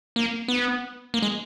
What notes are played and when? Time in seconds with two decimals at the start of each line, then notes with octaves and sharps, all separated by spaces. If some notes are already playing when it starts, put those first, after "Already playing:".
0.16 A#3
0.48 B3
1.14 A#3
1.22 G#3